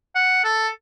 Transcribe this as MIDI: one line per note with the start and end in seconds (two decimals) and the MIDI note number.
0.15 0.40 78
0.44 0.68 69